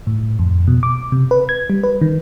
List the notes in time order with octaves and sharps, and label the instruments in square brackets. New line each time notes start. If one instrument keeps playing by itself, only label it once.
[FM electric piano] A2
F2
B2
D6
C3
B4
G#6
G3
B4
D#3